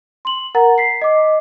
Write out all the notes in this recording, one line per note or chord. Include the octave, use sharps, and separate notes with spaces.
C6 F#7
A#4 F#5 A#5 A6
B6 C7
D#5 D6